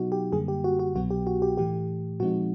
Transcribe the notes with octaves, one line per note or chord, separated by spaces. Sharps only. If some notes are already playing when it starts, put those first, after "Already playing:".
Already playing: B2 F#3 B3 D#4 F#4
G4
F#2 D3 G3 A#3 G#4
G4
F#4
F#4
C2 B2 F#3 B3 F#4
G4
F#4
G4
A2 E3 A3 G4
A#2 F3 G#3 C4 D#4 F#4